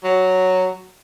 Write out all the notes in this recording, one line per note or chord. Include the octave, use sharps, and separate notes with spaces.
F#3